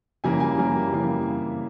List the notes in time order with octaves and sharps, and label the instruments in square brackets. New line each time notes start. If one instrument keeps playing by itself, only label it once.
[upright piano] F2 C#3 E3 G3 A#3 G#5
G#5
F2 C#3 E3 G3 A#3
F2 C#3 E3 G3 A#3